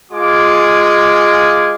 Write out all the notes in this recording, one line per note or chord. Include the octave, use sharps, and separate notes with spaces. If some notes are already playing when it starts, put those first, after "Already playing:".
G#3 F4 G#5 D6